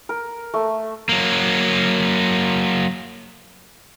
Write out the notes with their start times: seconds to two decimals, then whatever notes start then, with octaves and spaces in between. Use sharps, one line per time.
0.09 A#4
0.54 A3
1.09 F#3 A#3